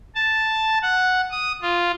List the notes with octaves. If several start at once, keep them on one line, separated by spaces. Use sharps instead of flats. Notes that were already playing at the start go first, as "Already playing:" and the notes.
A5
F#5
D#6
F4